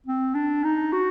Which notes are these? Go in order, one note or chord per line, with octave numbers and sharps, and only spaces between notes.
C4
D4
D#4
F#4